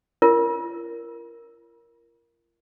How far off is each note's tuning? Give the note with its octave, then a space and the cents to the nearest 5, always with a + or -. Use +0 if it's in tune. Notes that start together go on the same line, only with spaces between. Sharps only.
F4 -45 A#4 +0